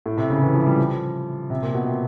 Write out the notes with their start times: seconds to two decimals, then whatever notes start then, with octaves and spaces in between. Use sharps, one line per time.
0.06 A2
0.18 C3
0.30 C#3
0.42 E3
0.54 F3
0.66 G3
0.79 F3
1.50 C3
1.62 A#2
1.75 B2
1.86 C3